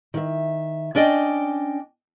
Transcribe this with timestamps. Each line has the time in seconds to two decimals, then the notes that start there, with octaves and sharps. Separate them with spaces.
0.14 D#3 E5
0.95 C#4 D4 D5 D#5 G5